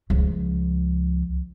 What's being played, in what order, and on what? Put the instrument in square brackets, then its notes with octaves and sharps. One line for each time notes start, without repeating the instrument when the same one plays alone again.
[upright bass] C#2 F3